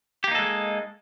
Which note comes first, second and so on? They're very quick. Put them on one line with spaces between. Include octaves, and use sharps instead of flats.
G4 A#3 D#4 A4 G#3